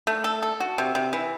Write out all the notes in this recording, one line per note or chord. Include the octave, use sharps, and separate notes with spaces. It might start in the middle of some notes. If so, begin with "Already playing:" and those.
A3
A4
A4
F#4
C3
C3
E3